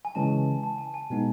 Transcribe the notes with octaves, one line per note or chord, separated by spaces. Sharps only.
G#5
C#3 E3 G#3 C#4 A5
A5
G#5
G#5
B2 G#3 B3 D#4